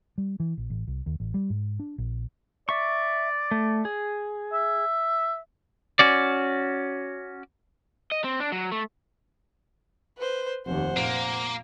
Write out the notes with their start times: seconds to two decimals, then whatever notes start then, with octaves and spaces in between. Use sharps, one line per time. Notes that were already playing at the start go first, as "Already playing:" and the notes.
0.18 G3
0.40 E3
0.58 A#1
0.70 A1
0.87 C2
1.06 D#2
1.20 A1
1.34 G3
1.50 G#2
1.80 D4
1.98 A#1
2.69 D5 E5 C#6
3.51 A3
3.85 G#4
4.52 E5
5.99 C#4 F#4 D5
8.12 D#5
8.24 C4
8.40 D4
8.52 F#3
8.72 A3
10.18 B4 C5
10.66 F1 D#2 C5 F#5
10.97 A#2 A#3